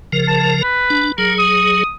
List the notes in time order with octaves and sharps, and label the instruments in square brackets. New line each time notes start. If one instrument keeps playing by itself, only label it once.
[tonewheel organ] C#3 F3 A#4
[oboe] A5
B4
[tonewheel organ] D4
[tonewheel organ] F#3 G#4 [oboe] A#4
[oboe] D#6